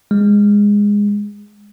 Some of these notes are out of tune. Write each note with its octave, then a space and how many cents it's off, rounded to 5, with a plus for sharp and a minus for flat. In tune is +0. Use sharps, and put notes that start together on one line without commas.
G#3 -15